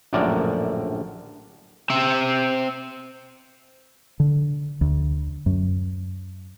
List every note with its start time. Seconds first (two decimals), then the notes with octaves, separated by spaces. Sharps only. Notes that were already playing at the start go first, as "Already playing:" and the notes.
0.13 A#1 F#2 A2 D3 A#4 D5
1.90 C4 E5
4.20 D3
4.81 D2
5.46 F#2